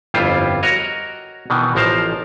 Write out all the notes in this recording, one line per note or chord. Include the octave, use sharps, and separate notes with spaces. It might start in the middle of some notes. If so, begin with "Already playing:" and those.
G1 F2 G3 E4 F4 C5
F#4 A#4 C#5 D#5
B2 D#3 E3
A1 F3 A#4 C5 A5